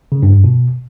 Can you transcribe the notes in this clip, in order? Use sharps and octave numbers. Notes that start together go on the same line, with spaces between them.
C#3
G2
F#2
B2